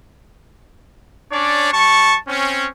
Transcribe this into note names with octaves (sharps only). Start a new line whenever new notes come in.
C#4 D4 C#5 D5
G3 A5 C#6
C4 C#4